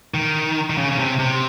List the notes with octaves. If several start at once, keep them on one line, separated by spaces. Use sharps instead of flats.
D#3
D#3
C#3
C#3
C3
C3